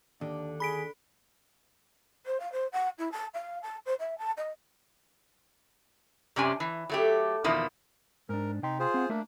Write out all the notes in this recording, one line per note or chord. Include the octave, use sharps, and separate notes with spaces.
D#2 D3 D4
G#4 B5 B6 D7
C5
F5
C5
F#5
E4
A5
F5
A5
C5
E5
A5
D#5
F#2 C3 C#4 D4 G4 G#5
E3
F#3 A3 G4
E2 B2 D#3 F3 A#3 E4
G#2 D4 A#4
C3 D#4 G5 C6
F4 G#4 C5
C4 F#5
A3 A#3 D4 A#4 E5